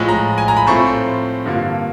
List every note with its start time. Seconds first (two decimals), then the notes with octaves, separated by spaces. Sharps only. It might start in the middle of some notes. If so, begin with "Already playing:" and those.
Already playing: A2 F3 G#3
0.09 A#5
0.38 G#5
0.48 A#5
0.57 B5
0.67 A2 F3 A3 C4 C#6
0.87 C6
1.45 G2 D3 F3 A#3